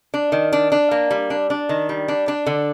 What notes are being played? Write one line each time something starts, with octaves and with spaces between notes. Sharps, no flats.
D4
D#3
D4
D4
A#3
G3
D4
D4
D#3
G3
D4
D4
D3